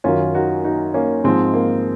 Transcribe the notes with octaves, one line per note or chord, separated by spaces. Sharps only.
F#2 D#3 F#3 C#4 F4
D#4 F#4
D#4 F#4
A#3 C#4
G#2 F3 G#3 C4
A#3